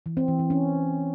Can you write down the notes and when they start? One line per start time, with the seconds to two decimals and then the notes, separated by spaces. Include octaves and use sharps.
0.06 E3
0.17 C4
0.28 E3
0.39 E3
0.50 C#4